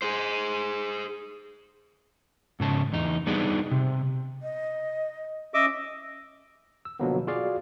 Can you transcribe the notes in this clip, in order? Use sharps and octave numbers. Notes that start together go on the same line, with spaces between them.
G#4 C5
G#2 C#3 A5
E2 D#4
G3 B3 D4 D#4 G#4
C3
D#5
C#4 D#5 E5 D6
E6
B2 D3 F3 F#3 A#3 B3
F4 F#4 G#4 D5 F5